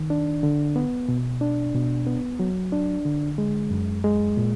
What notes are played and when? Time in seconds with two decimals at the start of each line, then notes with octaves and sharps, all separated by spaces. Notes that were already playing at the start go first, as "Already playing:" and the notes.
Already playing: D#3
0.10 D4
0.43 D3
0.76 B3
1.08 B2
1.41 D4
1.74 B2
2.06 B3
2.40 F#3
2.72 D4
3.05 D3
3.38 G#3
3.71 F#2
4.04 G#3
4.37 A#2